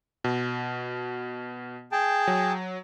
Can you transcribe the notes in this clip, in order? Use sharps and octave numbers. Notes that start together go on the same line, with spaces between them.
B2
G#4 G5 A5
F#3